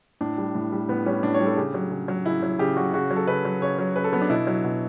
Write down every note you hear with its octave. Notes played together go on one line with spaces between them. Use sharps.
A2 D4
G3
A2
G3
A2 B3
G3 C#4
A2 D4
C#5
G3
A4
C#3 G4
F#3
C#3
F#3
C#3 E4
F#3
C#3 G4
F#3 F#4
C#3 F#4
F#3
A4
C#3 B4
F#3
C#3 C#5
F#3
C#3 B4
A4
F#3 B3
D4
B2 E4
F#3
B2